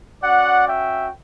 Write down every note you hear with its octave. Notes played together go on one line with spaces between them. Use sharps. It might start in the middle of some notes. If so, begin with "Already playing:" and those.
C#4 F#4 D5 F#5
E5 G5